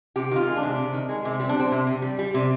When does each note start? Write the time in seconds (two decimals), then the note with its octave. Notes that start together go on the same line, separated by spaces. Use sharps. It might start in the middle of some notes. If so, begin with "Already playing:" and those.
0.16 C3 G4
0.31 D#3 F4
0.47 G#3
0.57 D4
0.63 C3
0.78 C3
0.93 D#3
1.09 G#3
1.25 C3
1.40 G3 C4
1.49 D4
1.56 G3 C4
1.72 C3
1.87 C3
2.02 G3
2.19 G3
2.34 C3